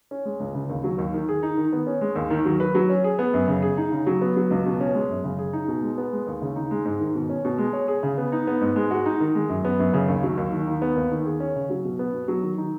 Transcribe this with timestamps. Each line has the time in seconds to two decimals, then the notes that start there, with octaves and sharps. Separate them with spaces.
0.11 C#4
0.25 G#3
0.40 C#2
0.55 C#3
0.69 D#2
0.84 F#3
0.98 D#2
1.14 D#3
1.29 G#4
1.43 D#4
1.57 D#3
1.72 B3
1.87 C#4
2.01 G#3
2.15 D#2
2.30 D#3
2.45 F#3
2.60 B4
2.75 F#3
2.89 C#4
3.04 G#4
3.19 B3
3.34 F#2
3.48 C#3
3.62 G#4
3.77 D#4
3.92 C#3
4.07 F#3
4.21 B3
4.36 F#3
4.50 C#2
4.66 B2
4.80 C#4
4.95 G#3
5.09 F#2
5.24 C#3
5.39 G#4
5.53 D#4
5.68 B2
5.83 G#3
5.98 B3
6.13 G#3
6.27 D#2
6.42 C#3
6.56 D#4
6.71 G#3
6.85 G#2
7.00 D#3
7.15 B2
7.29 C#4
7.45 B2
7.58 G#3
7.73 C#5
7.88 G#4
8.03 C#3
8.18 B3
8.32 D#4
8.47 B3
8.61 G#2
8.76 G#3
8.91 F#4
9.06 D#4
9.20 D#3
9.35 G#3
9.49 F#2
9.65 B3
9.79 F#2
9.94 C#3
10.08 D#2
10.23 F#3
10.37 D#2
10.52 D#3
10.67 D#4
10.82 B3
10.96 D#2
11.11 D#3
11.25 G#4
11.40 C#4
11.56 C#3
11.70 F#3
11.84 B2
11.99 B3
12.13 B2
12.28 F#3
12.43 D#3
12.58 D#4